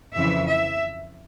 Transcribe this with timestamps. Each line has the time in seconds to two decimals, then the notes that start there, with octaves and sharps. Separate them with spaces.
0.16 F2 C#3 E3 E5
0.51 E5